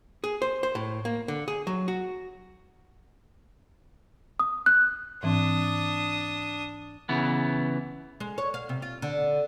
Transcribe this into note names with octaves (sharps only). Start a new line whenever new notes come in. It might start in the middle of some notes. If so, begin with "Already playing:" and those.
G#4
C5
C5
A2
A#3
D3
G#4
F#3
F#4
D#6
F#6
G#2 E3 C4 D4 D#6
C#3 E3 B3
G#3
C#5
F5
C3
F4
D3